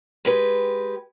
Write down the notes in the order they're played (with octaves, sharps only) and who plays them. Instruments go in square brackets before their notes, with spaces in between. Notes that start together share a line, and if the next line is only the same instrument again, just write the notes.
[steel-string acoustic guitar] G#3 G4 B4